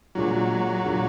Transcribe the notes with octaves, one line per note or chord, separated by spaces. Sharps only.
A#2 F#3 G#3 D4 F4
A#2 G#3 D4 F4